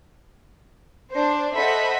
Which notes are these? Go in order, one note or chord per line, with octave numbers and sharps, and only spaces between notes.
D4 C5
A4 C5 D#5 E5 F#5 B5